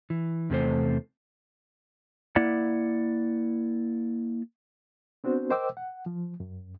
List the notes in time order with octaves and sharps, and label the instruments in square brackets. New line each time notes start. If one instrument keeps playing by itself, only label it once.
[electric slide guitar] E3
E2 C3 A3 C5
A#3 E4 D5 F#5
[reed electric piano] B3 C4 D4 F#4 C5
A#4 C5 D#5 G5 D6 E6
F#5
F3
F#2